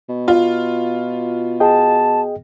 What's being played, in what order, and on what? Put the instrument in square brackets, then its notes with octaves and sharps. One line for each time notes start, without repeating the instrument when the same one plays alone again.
[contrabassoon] B2
[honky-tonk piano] F4
[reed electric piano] G#4 D#5 G5 [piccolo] A5